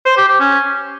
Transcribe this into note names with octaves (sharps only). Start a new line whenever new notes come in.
C5
G4
G4
C#4